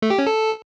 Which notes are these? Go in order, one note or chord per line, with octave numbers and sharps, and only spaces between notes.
A3
G4
C#4
A4